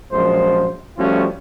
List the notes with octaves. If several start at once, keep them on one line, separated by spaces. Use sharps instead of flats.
A#1 F#2 F3 G#3 C5
F3 G3 A3 C#4 F4 F#4